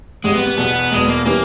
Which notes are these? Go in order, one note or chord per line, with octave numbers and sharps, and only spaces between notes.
G#1 G#2 G3 G#3
B3
B3
E1 E2 B2 B3
E1 E2 B2 G#3
A#3
E3 G3 A#3 C#4